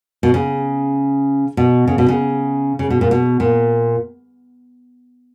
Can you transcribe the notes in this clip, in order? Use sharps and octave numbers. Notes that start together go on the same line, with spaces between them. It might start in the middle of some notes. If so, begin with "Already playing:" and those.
B2
C#3
B2
C#3
B2
C#3
C#3
B2
A#2
B2
A#2